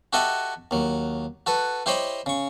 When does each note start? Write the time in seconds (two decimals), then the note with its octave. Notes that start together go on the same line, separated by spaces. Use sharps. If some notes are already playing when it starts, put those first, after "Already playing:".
0.13 F#4 G4 A4 D#5 E5 F#5
0.71 D#2 F#3
1.46 F#4 A4 B4
1.86 E4 G4 C5 C#5 D#5 B5
2.26 C#3 C#6